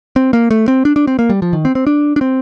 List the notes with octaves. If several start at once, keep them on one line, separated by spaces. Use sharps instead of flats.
C4
A#3
A3
C4
D4
D4
C4
A#3
G3
F3
D#3
C4
C4
D4
D4
C4